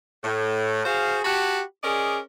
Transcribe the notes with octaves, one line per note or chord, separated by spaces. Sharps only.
A2
F#4 G#4 C5 F5
F#4 G4 F#5 A5 B5
C#4 G#4 A#4 D5 D#5